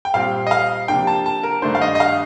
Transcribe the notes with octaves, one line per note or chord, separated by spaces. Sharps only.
G5
A#2 G3 C4 F5
D#5
F5
C3 F3 A#3 D4 G5
A5
A5
A#4
G2 D#3 A3 D4 C5
F5
D#5
D#5
F5